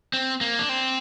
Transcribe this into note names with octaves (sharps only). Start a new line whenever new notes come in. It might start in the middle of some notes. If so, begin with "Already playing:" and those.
C4
A#3
D4
C4